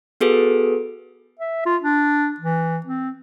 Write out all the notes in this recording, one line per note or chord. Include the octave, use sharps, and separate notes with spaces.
B3 F#4 G#4 A4 B4
E5
F4
D4
E3
C4